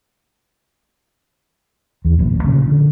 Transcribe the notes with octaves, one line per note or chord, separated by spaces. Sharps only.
E2
D#1 A#1 D#2 F#3
A1 G#2
A#2 C#3 F3
D3